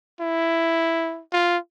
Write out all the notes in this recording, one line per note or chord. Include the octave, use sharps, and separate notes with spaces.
E4
F4